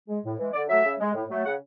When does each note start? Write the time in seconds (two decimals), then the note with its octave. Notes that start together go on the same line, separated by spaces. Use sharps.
0.09 G#3
0.24 A2
0.38 E3 G#3
0.53 D3 D5
0.68 F#3 A3 E5
0.84 C#3
0.99 G#3
1.14 A2
1.29 F#3 A3
1.45 C#3 F#5